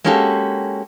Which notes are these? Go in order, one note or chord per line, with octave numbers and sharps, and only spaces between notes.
G#3 A#3 C#4 F#4 G4 A4